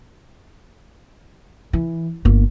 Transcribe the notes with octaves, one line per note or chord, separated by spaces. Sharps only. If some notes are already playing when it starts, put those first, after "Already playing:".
E3
G1 A#3